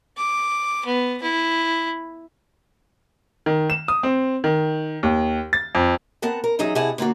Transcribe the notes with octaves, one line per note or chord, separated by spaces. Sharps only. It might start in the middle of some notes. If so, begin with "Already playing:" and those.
D6
B3
E4
D#3
E7
D#6
C4
D#3
D#2
A6
F2
B3 C4 A#4 F#5 A5
A#4
E2 F#3 D#4 G#4 D#5 E5
C3 E4 G#4 D#5 F#5 A5
D3 A#3 F4 F#4